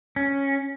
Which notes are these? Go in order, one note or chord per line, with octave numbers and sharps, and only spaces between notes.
C#4